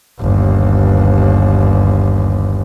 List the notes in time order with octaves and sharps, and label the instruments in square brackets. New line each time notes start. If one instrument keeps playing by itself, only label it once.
[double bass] G1 D#2